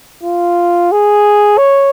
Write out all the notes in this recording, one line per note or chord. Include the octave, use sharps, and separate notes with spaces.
F4
G#4
C#5